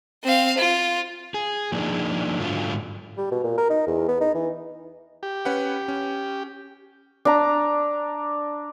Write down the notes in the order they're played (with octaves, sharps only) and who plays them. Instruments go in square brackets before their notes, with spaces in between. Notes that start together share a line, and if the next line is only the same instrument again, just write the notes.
[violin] C4 F5
F4
[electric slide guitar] G#4
F3 A#3 D4 D#4 G#4
G#2 D3 F#3 A3 F4
[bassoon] G3
B2
A#2
A#4
D#4
E2
B3
D#4
E3
[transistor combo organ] G4
[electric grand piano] C#4 B4 F#5
C#4
[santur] D4 A#5